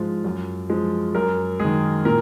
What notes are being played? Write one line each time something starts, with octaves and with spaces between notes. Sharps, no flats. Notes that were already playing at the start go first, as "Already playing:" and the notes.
Already playing: G#2 F3 G#3 F4
F#2
F3 G#3
F#2 A#4
D#3 G#3 G#4
A#2 A#4